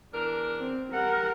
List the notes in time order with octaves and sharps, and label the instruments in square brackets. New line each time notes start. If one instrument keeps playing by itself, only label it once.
[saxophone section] E2 D4 A#4
[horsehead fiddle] C4
[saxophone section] G3 F#5 [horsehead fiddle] A#4